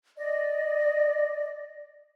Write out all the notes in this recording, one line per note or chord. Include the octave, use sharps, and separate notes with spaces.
D5 D#5